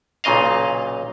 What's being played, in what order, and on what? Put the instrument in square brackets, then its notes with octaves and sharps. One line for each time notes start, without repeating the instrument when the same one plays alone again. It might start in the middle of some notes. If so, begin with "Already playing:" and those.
[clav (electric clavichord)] B1 A#2 C#3 D#5 F5